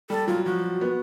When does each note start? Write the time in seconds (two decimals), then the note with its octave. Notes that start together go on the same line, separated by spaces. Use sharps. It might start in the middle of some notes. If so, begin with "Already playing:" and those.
0.10 G3 A4
0.28 F#3 F4
0.45 F3 F#4
0.81 B3